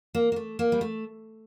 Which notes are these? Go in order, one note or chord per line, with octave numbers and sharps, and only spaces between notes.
A#3
A#3
A3
A#3
G3
A3